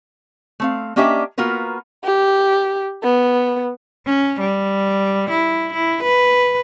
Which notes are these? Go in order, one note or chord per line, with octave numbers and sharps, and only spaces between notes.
A3 C4 F5
A#3 C#4 D4 G4 D#5 E5
A#3 B3 F4 F#4 A#4 B4
G4
B3
C#4
G3
E4
E4
B4